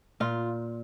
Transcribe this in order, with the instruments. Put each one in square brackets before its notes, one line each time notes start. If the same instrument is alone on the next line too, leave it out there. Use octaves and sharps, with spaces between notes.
[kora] A#2 F4